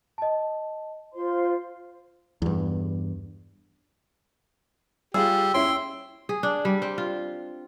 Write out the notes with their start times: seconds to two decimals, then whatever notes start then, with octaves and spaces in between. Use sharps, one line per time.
0.18 D#5 A5
1.14 F4 C5 C6
2.42 E2 G2
5.14 G3 F4 G4 G#4 E6
5.54 C#4 E4 G5 C6
6.29 G#4
6.43 D4
6.65 G3
6.82 C4
6.98 F4